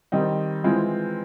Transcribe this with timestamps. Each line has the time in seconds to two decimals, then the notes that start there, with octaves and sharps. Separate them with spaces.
0.12 D#3 G3 C4 D#4
0.64 E3 G#3 C4 F4